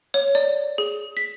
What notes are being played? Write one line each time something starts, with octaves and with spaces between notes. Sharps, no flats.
C#5
D5
G#4
B6